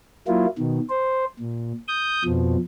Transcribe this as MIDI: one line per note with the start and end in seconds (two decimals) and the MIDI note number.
0.28 0.46 54
0.28 0.46 58
0.28 0.46 64
0.28 0.46 65
0.59 0.80 47
0.59 0.80 51
0.90 1.25 72
1.40 1.73 46
1.88 2.23 87
1.88 2.23 91
2.25 2.57 41
2.25 2.57 47
2.25 2.57 53